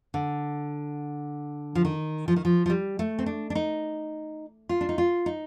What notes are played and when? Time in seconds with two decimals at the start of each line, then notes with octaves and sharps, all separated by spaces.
0.14 D3
1.75 F3
1.85 D#3
2.28 F3
2.36 D#3
2.45 F3
2.66 F3
2.70 G3
2.99 A3
3.19 C4
3.26 D4
3.50 D4
3.55 D#4
4.69 F4
4.81 D4
4.89 D#4
4.98 F4
5.26 D#4